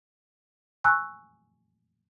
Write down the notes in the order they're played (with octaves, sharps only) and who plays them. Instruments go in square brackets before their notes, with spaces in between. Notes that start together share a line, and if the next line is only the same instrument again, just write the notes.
[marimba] G#5 A#5 C#6 E6 F#6